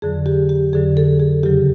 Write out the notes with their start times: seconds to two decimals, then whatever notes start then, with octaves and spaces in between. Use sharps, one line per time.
0.02 F2 D3 F#3 G#4
0.26 G4
0.49 G4
0.73 F2 D3 F#3 G#4
0.97 A4
1.20 G#4
1.43 E2 C#3 F#3 G4